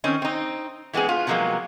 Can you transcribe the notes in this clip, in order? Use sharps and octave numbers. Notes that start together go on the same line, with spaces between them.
D#3 C4 C#4 D#5
C4 D#4
E3 G#3 B3 C4 G#4
B3 F4
C3 F3 F#3 G#3 A#3 B3